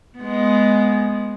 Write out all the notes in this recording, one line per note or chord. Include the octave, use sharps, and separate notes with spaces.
G#3 B3